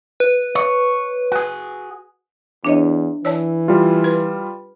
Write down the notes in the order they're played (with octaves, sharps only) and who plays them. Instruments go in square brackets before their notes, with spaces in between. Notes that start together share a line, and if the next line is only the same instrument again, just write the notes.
[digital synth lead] B4
[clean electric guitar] C#5
F#4 G#4
[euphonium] E2 [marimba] D4 C#5 D#5
[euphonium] E3 [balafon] C#5 D5 A5 [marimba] E6
[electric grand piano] G3 F4
[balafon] B4